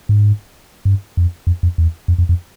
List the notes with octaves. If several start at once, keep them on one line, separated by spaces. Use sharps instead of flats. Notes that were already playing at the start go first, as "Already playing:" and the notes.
G#2
G2
F2
F2
F2
E2
F2
F2
F2